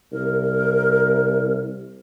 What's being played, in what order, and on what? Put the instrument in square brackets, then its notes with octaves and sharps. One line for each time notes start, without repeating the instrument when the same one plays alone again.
[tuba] C2 [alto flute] A#4